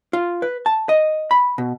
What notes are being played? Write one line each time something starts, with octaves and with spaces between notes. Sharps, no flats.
F4
B4
A5
D#5
B5
B2